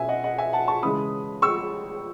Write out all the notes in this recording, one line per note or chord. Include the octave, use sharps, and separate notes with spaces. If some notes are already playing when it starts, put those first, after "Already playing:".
Already playing: B2 F#3 C#4 E5 G#5
D#5 F#5
D#5 F#5
E5 G#5
F#5 A5
A5 C#6
C#3 E3 G#3 B5 D#6
C#6 E6